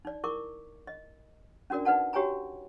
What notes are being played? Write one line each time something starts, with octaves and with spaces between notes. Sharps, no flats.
D#4 D5
E4 A#4 C#6 D6
D#5
C#4 D4 F#4 A#4 D5
D#4 B4 D5 F#5 A5
F#4 G4 C#5 G5 G#5 A#5